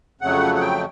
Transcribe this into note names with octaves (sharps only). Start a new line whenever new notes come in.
F2 C#3 F#3 A3 F#5
F#5
G5